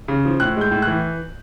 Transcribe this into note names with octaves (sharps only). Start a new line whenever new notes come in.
C#3
F3
A2 F#6
G#3 G6
A2
E3 F#6